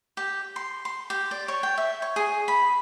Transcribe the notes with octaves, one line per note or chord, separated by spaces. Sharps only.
G4
C6
C6
G4
D5
C#5
G5
E5
C#5
G#4
B5